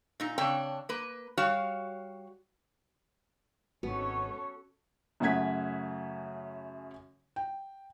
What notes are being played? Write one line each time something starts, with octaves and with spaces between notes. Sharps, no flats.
A#2 D#4
C#3 C4 D4 C#5 G5
A#3 B4
G3 F#4 C#5 F5
G#1 G#2 C3 B3 C#4 F#4 A4 C#5
F#2 C#3 A3 F#5 G#6 B6
G5